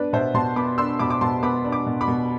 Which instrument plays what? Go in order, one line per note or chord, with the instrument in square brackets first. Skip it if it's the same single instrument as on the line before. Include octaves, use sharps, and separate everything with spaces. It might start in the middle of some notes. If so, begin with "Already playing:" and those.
Already playing: [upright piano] B3 D4 B4 D5
B2 C5 E5
B2 A5 C6
B3 B5 D6
D4 C6 E6
B2 B5 D6
D6
B2 A5 C6
B3 B5 D6
D4
B5 D6
B2
B5 D6
B2